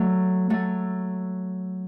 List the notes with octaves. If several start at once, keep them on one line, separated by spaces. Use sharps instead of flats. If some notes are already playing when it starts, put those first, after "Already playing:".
Already playing: F#3 A3
F#3 A3